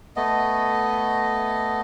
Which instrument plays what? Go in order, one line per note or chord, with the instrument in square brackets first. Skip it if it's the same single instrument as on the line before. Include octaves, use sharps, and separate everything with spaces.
[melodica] A3 B3 D#5